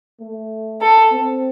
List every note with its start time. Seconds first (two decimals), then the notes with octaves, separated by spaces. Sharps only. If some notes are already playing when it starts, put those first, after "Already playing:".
0.20 A3
0.81 A4
1.12 C4